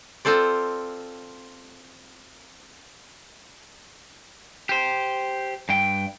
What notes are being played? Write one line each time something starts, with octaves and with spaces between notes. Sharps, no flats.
C4 F4 A4 C5 D5
G4 C5
G2 G5